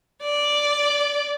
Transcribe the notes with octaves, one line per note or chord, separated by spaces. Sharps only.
D5